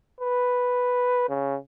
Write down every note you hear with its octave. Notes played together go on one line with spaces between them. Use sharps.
B4
C#3